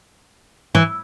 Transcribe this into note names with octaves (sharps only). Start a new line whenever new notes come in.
E3